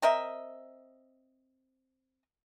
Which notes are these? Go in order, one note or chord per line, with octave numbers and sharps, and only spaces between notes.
C4 A#4 D#5 E5